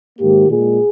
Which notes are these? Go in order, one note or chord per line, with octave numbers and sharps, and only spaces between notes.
G#2 D#3 A#3 G4
A#2 G#3 G#4